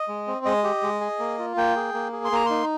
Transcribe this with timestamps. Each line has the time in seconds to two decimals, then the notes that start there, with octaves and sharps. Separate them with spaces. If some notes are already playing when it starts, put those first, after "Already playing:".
Already playing: D#5
0.08 G#3
0.27 C4
0.45 G#3 D#5
0.64 G4
0.83 G#3
1.01 G#4
1.19 A#3
1.39 F4
1.57 A#3 G5
1.76 G#4
1.94 A#3
2.13 G#4
2.25 C6
2.32 A#3 A#5
2.46 D#4 C6